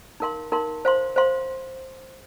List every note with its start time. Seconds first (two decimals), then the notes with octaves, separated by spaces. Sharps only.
0.20 D#4 A#4 F5 C6
0.52 D#4 A#4 F5 C6
0.85 C5 F5 C6
1.16 C5 F5 C6